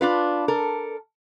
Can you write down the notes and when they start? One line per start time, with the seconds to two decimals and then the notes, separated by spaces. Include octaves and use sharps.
0.01 D4 F4 B4
0.48 A4 A#4